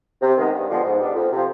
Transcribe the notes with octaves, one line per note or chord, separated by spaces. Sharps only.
C3
D#3 G#3 B3 D#4
G2
D3 F3 G#3 B3
G#2
G3 B3 D4
F2
C3 F3